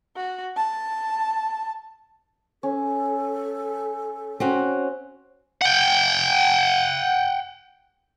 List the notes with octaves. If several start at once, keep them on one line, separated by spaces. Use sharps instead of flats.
F#4
A5
C#4 A4
C4 C#4 F#4
F#5 G5